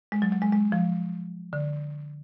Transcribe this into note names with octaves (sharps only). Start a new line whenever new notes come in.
G#3
F#3
F#3
G#3
G#3
F3
D3